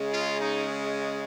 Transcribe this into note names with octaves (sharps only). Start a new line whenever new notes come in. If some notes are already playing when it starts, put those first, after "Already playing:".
Already playing: C#3 G#3
F4
D#4